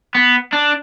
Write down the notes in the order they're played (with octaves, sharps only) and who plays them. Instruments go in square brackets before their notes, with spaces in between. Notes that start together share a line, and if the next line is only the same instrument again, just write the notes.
[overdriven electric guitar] B3
D4